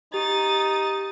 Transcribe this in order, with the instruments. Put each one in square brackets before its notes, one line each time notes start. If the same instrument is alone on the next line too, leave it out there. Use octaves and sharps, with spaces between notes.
[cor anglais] D#4 [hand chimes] G4 [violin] D#6 A6